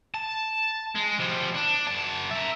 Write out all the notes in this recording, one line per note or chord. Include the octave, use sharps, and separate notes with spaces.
A5
G#3
F3 G3
D4
F#2 A5
A#4 E5